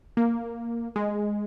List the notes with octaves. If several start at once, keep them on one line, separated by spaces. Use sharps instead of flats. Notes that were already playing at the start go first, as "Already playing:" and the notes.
A#3
G#3